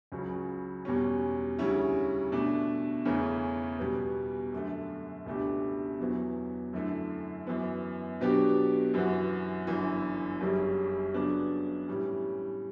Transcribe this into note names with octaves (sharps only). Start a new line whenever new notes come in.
C#2 C#3 F#3 C#4
E2 B2 G3 C#4
D2 C#3 G3 C#4 E4
B2 A3 D4
E2 C#3 E3 A3 C#4
B2 G3 B3
F#2 D3 A3
C#2 B2 A3 D4 G4
E2 B2 F#3 B3 E4
F#2 D3 A3 E4
F#2 E3 B3
B2 F#3 B3 D4 G4
F#2 E3 B3 F#4
G1 F#2 E3
F#1 F#2 C#3 G3 C#4
C#3 F#3 B3 D4
A2 E3 G3 C#4